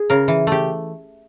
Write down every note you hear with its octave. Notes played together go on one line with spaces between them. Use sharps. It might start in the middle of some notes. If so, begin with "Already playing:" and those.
Already playing: G#4
C#3 A#4
E3
A3 G4